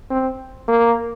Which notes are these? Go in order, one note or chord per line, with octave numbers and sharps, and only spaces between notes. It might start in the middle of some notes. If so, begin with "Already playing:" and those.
C4
A#3